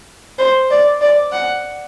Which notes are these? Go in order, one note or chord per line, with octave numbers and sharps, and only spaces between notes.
C5
D5
D5
F#5